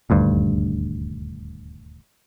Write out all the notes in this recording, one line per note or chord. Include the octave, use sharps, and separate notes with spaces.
D#1 D2 G2